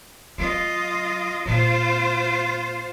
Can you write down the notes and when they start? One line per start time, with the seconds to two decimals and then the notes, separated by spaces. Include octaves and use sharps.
0.38 F#3 F4 D#5
1.46 A#2 G#3 F4 C5